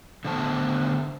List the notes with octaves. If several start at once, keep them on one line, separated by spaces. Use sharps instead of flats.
D3 A3 B3 C5 A5